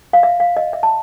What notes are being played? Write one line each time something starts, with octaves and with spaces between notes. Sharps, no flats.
F5
E5
F5
D#5
E5
A5